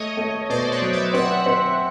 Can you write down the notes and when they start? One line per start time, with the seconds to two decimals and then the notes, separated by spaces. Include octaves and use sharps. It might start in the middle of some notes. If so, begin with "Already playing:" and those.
Already playing: A3 C#5 D#5
0.17 A3
0.49 B2 C5 D5
0.71 B4 C#5
0.82 F#3
0.92 D5 E5
1.13 C4 E5 F#5
1.46 C4